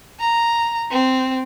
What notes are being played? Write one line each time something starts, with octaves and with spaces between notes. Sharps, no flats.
A#5
C4